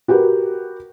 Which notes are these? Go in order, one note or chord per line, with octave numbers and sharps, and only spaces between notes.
F#4 G4 A#4 B4